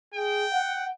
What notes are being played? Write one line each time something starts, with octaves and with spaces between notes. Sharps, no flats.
G#4 G5
F#5